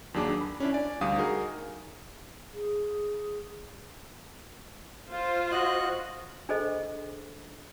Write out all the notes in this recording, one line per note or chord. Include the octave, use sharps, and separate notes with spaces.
D#2 F#3 D4 G#4 D6
B5
C#4 D4 E4
D5 G#5
D2 G3 G4 F5 D#6
D#4 F#4 G#4 A#4
G#4
F4 C5
F#4 D#5 F#6
D4 G#4 A4 C5 D#5